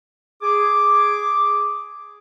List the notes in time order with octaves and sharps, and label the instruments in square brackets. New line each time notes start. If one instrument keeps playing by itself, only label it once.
[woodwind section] G#4 D6